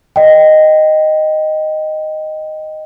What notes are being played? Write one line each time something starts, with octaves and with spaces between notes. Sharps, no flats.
D#5 G5